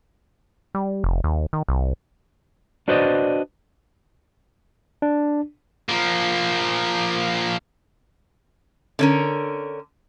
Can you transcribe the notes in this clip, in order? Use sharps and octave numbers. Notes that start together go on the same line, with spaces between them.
G3
F1
D#2
D#3
C2
D4 F#4 B4 C5 D5 D#5
D4
F3 A#3
D3 C#4 A#4